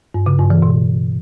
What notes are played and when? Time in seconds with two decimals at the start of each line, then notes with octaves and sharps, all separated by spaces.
0.14 G2
0.26 C#3
0.38 G2
0.50 E3
0.62 B2